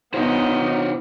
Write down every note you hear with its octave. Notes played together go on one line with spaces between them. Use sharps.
B3 D#4 E4 C5 C#5